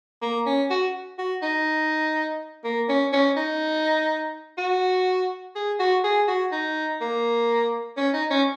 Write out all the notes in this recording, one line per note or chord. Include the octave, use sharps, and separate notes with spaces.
A#3
C#4
F#4
F#4
D#4
A#3
C#4
C#4
D#4
F#4
G#4
F#4
G#4
F#4
D#4
A#3
C#4
D#4
C#4